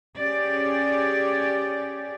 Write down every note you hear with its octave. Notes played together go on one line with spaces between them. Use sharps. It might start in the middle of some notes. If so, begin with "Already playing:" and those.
C#4 G4 G#4 D5